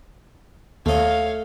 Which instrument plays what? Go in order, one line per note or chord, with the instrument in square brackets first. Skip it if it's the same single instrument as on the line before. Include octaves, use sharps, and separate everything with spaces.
[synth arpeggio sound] D#2 [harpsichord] A3 D#5 [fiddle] C#5 F5